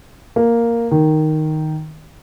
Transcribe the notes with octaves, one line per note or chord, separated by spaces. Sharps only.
A#3
D#3